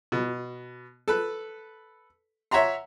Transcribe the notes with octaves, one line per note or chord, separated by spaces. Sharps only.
B2
A4 B4
C#5 E5 F#5 A#5 C6